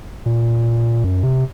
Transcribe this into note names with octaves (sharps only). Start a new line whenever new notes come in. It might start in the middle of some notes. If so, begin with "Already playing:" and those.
A#2
F#2
C3